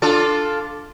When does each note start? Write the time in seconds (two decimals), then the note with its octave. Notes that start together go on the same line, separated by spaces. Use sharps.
0.02 D4 F4 A4